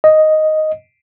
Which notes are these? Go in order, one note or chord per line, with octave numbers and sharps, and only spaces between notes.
D#5